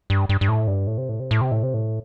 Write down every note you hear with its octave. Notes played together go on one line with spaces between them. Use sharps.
G2
G2
G2
A2
G2
A2
C3
A2
C3
A2
C3
A2
C3
A2